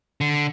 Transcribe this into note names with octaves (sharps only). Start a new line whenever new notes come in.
D3